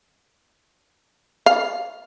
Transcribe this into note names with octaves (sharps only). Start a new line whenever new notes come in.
F5